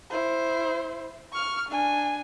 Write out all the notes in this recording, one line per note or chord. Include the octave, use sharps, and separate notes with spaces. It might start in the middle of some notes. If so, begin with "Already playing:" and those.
E4 C5
C#6 F6
D4 G#5